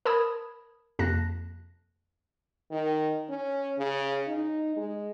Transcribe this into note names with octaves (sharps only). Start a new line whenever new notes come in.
A#4 A5 B5 D#6 G#6
F2 C3 A#3 A5 F#6 A#6
D#3
C#4
C#3
D#4
G#3